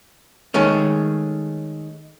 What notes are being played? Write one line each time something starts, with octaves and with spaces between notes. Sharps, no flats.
D#3 G#3 A3 C#4